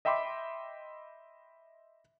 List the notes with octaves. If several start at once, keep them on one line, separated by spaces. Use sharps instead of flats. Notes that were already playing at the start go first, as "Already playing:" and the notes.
D#5 E5 G5 B5 C6 D6